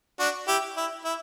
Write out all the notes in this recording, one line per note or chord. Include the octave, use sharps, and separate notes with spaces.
D4 F#4
E4 G4
E4
E4